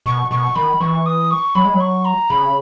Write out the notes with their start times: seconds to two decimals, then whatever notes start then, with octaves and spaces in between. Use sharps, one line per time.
0.06 B2 C#6
0.31 B2 C#6
0.55 D#3 B5
0.81 E3 C#6
1.06 D#6
1.31 C#6
1.55 F#3 B5
1.64 G#3
1.74 F#3
1.80 C#6
2.05 A#5
2.30 C#3 B5